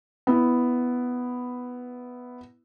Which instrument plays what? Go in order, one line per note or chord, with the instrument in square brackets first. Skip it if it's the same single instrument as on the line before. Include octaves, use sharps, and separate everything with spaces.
[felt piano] B3 E4